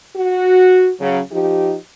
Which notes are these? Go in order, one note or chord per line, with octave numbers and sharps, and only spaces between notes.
F#4
C#3 F#3
F3 D#4 G4